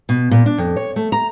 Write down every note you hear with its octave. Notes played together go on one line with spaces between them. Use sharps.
B2
A#2
D4
F2
C#5
A3
A#5